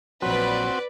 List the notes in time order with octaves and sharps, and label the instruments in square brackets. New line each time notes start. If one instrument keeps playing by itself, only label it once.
[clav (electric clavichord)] A#1 F#3 [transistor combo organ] C4 F#4 [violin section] B4 D5